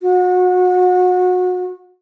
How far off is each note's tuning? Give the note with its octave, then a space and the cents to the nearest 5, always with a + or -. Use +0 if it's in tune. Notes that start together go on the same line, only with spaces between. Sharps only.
F#4 -30